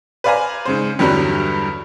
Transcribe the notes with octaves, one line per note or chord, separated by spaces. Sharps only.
B4 C5 D5 F5 G#5 A#5
G#2 C#3 C5
E2 G2 D3 F#3 G3